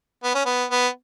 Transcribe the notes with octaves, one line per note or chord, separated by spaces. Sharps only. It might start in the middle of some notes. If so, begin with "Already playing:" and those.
B3
C#4
B3
B3